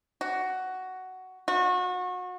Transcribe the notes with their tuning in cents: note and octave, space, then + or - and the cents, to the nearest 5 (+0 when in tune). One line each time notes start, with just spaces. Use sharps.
F#4 +10
F#4 -30